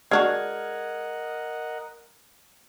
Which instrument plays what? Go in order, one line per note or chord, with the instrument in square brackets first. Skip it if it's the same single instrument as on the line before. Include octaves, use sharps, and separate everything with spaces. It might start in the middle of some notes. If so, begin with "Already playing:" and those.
[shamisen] G#3 D4 F#4 [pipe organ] A#4 D#5 F#5 [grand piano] F6 G#6